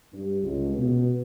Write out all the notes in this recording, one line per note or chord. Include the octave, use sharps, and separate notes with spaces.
G2
C#2
B2